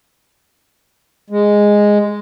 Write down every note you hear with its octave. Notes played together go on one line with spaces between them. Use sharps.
G#3